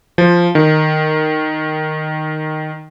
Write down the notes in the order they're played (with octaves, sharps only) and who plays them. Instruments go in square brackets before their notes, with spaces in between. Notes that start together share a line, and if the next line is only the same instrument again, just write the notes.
[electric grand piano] F3
D#3